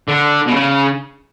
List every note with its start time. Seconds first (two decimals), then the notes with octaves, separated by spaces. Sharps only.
0.09 D3
0.47 B2
0.54 C#3